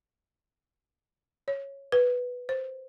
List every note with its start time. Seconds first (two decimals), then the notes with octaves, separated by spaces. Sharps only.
1.48 C#5
1.92 B4
2.49 C5